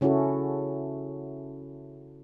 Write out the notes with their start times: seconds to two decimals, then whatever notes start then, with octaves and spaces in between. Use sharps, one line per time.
0.01 C#3 C#4 E4 F#4 A4